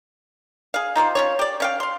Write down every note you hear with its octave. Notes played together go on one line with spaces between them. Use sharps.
G#4 F5
D#4 F4 G4 C5
C#4 F4 C#5
G4 D5
C#4 F5 G5
F5 C6